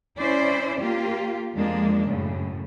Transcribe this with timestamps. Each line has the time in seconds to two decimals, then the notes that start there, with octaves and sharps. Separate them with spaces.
0.18 C#4 E4 C5 D5
0.79 A#3 F4 G4
1.57 F2 F3 G#3 A#3 D4
2.09 F#2 A2 C#3